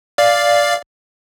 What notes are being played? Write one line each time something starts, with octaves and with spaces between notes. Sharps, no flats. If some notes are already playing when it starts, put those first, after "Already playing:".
D5 F5